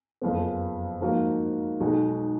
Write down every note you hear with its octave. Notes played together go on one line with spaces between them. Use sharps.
F#1 F2 F3 B3
G#2 F3 A#3 D#4 F#4
B1 B2 G#3 D#4 F#4